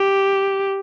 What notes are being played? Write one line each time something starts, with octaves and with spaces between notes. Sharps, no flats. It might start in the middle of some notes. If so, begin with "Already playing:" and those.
Already playing: G4